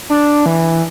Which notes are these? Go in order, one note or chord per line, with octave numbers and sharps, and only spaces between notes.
D4
E3